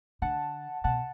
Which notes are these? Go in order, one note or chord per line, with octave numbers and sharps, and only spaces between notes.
D3 F#5 A5
B2 F#5 A5